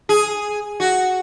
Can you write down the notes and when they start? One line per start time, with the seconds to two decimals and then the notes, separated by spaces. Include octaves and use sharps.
0.09 G#4
0.80 F#4